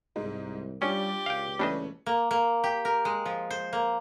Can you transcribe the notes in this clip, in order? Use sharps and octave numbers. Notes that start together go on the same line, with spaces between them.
C2 G#2 G#3 D#4
G3 C#4 D4 F4 G4 D5
C#2 F5 G5
E3 G3 A3 C#4 D4 D#5
A#3
A#3
G4
A#4
G#3
F3
C5
A#3